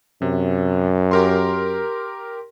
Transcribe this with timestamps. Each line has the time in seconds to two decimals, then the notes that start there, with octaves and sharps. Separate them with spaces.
0.22 F#2 C3
1.11 G4 A#4 C6